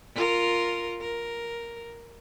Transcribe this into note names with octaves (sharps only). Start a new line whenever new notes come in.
F4 A#4
A#4